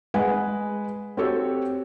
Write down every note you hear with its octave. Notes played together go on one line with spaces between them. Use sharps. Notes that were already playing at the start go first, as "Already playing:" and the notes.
G#3 B4 F#5 G#5
C4 F#4 G4 A4 C#5